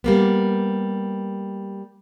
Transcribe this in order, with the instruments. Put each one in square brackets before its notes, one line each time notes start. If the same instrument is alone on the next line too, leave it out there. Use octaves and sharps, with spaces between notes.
[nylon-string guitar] G3 A#3 B3